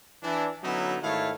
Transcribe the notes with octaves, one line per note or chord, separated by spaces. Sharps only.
E3 D4
D3 F#3 B3 C#4 D#4 E4
G#2 D#3 A3 E4 C#5 F5